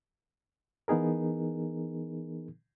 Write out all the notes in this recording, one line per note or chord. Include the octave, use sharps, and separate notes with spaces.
E3 B3 D#4 G#4 A#4